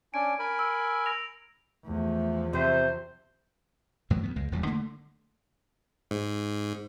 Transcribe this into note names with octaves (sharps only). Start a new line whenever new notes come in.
C#4 D4 G#5 D7
A#4 G#5 B5
E6
E6 A#6 F7
E2 F3 A3
C3 C5 E5
F#2 A2 E3 F#3
D2 E3 B3
C#2 G#3
D#1 E2 G2 G3
D3 A3 A#3
G#2